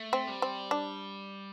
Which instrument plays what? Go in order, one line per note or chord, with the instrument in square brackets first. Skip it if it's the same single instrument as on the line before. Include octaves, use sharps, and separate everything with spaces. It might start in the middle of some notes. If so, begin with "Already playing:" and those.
Already playing: [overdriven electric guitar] A3
[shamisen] C4
[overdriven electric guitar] G3
[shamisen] C4
D4